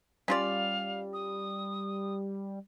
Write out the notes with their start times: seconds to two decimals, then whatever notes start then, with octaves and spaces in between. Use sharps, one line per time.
0.28 G3 C#4 F4 D5 F5
1.13 D#6